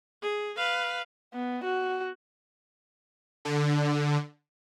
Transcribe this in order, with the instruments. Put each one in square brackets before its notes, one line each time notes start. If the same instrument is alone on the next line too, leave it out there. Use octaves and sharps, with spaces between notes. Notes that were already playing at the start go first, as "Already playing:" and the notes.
[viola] G#4
B4 F5
[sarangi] B3
F#4
[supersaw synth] D3